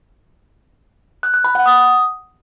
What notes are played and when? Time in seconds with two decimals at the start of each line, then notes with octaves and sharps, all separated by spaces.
1.23 F#6
1.34 F#6
1.44 B5
1.55 F#5
1.66 D#6